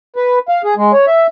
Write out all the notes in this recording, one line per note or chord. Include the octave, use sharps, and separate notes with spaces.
B4
F5
G#4
G#3
C#5
E5